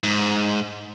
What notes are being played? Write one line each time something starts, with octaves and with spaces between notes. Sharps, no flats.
G#2